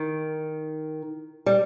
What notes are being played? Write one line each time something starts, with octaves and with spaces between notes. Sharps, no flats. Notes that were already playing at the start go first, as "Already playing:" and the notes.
Already playing: D#3
G3